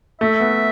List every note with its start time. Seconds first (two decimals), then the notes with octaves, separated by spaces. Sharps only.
0.21 A3 E5
0.40 B3